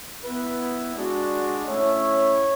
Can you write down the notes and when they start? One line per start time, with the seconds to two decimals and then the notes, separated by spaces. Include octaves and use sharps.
0.24 B3 E4 B4
0.95 G#3 D4 F#4 D5
1.66 A3 C#4 E4 C#5